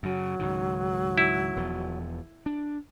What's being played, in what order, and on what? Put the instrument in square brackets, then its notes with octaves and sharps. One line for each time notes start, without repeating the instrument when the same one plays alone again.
[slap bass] F#2 C#3 [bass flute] F#3
[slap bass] C#2 G#2 D#3
[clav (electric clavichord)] E4
[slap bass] E1 E2 F3
D4